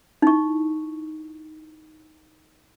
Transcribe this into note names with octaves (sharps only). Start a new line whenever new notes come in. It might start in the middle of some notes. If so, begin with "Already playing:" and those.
D#4 E4 C#6